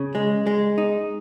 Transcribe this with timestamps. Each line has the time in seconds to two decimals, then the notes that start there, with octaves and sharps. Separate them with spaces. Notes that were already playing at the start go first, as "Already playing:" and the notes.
Already playing: C#3
0.15 G#3
0.47 G#3
0.78 D#4